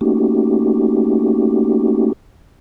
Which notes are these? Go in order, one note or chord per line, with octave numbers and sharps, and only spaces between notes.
A3 A#3 C#4 D#4 F#4 G4